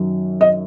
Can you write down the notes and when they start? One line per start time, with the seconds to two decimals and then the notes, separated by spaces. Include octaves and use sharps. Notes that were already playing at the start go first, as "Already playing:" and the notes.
Already playing: F#2 D#3 F#3
0.41 D#5